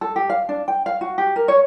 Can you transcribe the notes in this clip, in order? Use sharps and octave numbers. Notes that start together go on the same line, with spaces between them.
A4
G4
F5
D4
G5
F5
F#4
G4
A#4
C#5